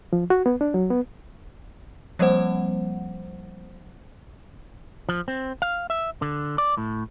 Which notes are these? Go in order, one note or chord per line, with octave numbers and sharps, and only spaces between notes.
F3
F#4
B3
D4
F#3
B3
F3 G3 A#3 C4 C5 F#5
F3
C4
F5
E5
D3
D5
A2